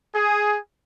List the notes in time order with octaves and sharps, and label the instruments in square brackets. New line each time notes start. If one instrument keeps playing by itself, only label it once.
[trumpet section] G#4